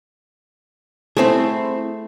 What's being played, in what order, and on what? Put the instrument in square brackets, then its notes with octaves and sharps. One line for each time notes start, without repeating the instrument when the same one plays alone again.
[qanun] A3 C5 [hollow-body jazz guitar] C4 E4 G#4